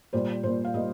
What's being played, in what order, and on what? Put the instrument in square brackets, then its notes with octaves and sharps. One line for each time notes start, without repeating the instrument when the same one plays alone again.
[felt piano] A#2 G3 A#3 C5
A#2 G3 A#3 C5
F5
A#2 G3 A#3 D#5